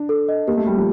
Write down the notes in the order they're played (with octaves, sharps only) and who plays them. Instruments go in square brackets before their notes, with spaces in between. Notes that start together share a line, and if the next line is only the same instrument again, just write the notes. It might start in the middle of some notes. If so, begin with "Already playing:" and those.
Already playing: [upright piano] D4
[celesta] A4
D#5
[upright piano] A#3 [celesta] G4
[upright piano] A3
[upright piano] G3 [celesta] G4
[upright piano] F3